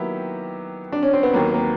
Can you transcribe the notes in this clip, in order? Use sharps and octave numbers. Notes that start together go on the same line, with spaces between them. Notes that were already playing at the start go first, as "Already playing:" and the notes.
Already playing: D#3 F#3 A#3 B3 E4 G4
D4
C#4
C4
B3
D#2 D#3 F#3 A#3 B3
A#3